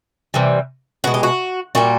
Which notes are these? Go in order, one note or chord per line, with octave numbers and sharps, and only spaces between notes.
C3 E3 G3
B2 G#3 F#4
G4
F#4
A#2 G3 F#4